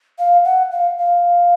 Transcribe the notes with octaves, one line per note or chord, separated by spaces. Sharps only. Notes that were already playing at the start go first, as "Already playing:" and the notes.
F5
F#5
F5
F5